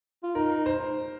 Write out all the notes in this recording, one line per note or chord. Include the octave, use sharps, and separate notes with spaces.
F4
D#4 A#4
C5